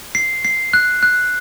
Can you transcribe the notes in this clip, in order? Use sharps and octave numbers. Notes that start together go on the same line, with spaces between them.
C7
C7
F#6
F#6